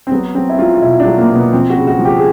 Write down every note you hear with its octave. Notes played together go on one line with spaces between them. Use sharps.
C4
F#3 B3
F#3 C4
E4
F#3 F4
F4
B2 E4
D4
F#3
A#3
B2
B3
F3 C4
F#4
C#3
F#4
F3
G4
G#4